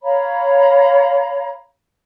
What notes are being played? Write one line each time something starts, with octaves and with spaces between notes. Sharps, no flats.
C#5 F5 A#5 B5